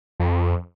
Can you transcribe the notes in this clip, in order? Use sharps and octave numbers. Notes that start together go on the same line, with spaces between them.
F2